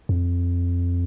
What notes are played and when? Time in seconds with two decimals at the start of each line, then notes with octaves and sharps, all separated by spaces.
0.09 F2